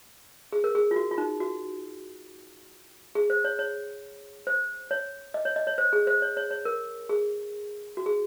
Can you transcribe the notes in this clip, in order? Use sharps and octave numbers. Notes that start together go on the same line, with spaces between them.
G#4
A#4
G#4
F4
F#4
F4
D#4
F#4
G#4
C5
C#5
C#5
C5
C#5
D#5
C#5
D#5
C#5
C5
G#4
C5
C#5
C#5
C#5
A#4
G#4
F#4
G#4